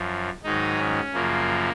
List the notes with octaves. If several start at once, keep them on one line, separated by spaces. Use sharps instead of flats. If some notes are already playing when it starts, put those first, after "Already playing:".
Already playing: F#2 F3
G#2 D#3 F#3 D#4
C#4
F#2 C#3 F3 A#3